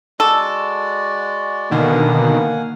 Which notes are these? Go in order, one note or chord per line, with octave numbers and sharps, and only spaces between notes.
G#3 F#4 A4 D5
B2 D3 D#3 A#3 F5 F#5 G#5